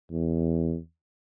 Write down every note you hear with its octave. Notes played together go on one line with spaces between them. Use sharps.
E2